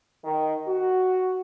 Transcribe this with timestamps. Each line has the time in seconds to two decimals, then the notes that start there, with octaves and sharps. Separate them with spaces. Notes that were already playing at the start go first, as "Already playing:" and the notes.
0.25 D#3
0.68 F#4